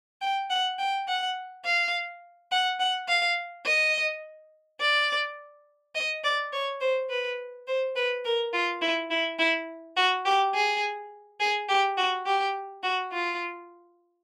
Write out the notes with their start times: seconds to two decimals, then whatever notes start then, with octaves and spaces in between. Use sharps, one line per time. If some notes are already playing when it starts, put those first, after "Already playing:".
0.21 G5
0.50 F#5
0.79 G5
1.08 F#5
1.65 F5
2.52 F#5
2.80 F#5
3.08 F5
3.66 D#5
4.80 D5
5.95 D#5
6.24 D5
6.53 C#5
6.81 C5
7.10 B4
7.67 C5
7.96 B4
8.25 A#4
8.53 F4
8.82 E4
9.11 E4
9.39 E4
9.97 F#4
10.26 G4
10.54 G#4
11.40 G#4
11.69 G4
11.97 F#4
12.26 G4
12.83 F#4
13.12 F4